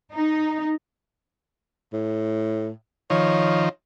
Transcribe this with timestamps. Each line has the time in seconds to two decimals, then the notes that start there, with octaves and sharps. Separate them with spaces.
0.13 D#4
1.93 A2
3.10 D#3 F3 C#5